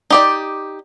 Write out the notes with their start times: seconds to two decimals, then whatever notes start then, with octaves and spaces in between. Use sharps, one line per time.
0.10 D#4 G4 D5